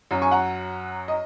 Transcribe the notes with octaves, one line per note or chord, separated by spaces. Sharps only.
F#2 F#3
G#5 C#6
F#5 A#5
D#5